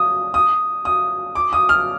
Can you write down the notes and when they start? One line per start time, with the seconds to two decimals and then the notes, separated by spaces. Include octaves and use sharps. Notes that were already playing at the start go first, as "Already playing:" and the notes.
Already playing: D#6
0.34 D#6
0.85 D#6
1.35 D6
1.53 D#6
1.69 F6